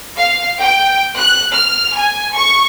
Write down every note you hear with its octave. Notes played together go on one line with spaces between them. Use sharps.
F5
G5
F#6
F6
G#5
C#6